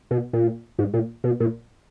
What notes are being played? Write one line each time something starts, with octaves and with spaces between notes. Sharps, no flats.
B2
A#2
G#2
A#2
B2
A#2